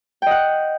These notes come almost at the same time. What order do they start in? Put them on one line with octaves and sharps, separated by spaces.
G5 D#5 F#5